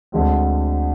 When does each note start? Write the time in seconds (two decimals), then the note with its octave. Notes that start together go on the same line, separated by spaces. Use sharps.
0.12 D2 D3 G#3 C4